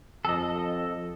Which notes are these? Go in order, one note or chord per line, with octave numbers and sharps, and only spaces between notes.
F2 A4 D#5